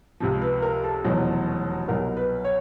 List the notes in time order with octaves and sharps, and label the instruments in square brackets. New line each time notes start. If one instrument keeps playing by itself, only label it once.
[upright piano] C#2 C3 F3
B4
A#4
A4
F1 E2 B2 F#3
C2 B2 F#3 A#4
B4
C#5